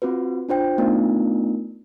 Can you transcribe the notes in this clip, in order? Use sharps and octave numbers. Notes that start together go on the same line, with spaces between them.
C4 F4 F#4 B4
D4 F4 C5 G5
A3 B3 D4 D#4 F4 A#4